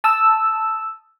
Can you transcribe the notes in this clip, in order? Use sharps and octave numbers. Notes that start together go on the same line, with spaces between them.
A5 D#6 E6